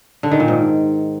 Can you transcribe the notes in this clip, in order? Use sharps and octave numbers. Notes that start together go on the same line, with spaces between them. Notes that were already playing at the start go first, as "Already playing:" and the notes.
D3
D#3
A#2
G#2